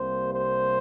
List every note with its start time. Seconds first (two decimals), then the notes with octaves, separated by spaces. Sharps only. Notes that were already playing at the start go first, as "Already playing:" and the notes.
Already playing: C2 C3 G3 A#3 C5
0.33 C5